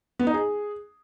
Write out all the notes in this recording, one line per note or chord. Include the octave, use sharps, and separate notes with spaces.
B3
D#4
G#4